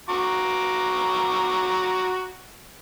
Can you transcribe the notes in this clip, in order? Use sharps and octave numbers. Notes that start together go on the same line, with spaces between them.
F#4 A#5 D6